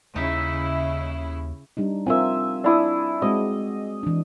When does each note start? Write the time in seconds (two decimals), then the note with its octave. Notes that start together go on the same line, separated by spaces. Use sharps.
0.16 D#2 C#3 D#4 E4 E5
1.77 G3 D4 D#4
2.06 C4 F4 A#4 E5 G#5
2.64 D4 E4 D#6
3.22 G#3 C4 F#4 D#5
4.03 E3 D4